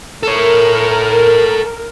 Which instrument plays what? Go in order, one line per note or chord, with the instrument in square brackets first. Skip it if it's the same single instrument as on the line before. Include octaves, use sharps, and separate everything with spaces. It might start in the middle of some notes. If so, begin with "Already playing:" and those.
[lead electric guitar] A4 C#5 [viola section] A#4